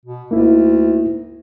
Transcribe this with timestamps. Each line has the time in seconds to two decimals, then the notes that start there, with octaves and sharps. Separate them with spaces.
0.06 B2
0.31 D2 A#3 D#4 E4